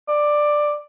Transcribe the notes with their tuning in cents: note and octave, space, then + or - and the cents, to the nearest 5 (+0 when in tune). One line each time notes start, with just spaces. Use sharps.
D5 +10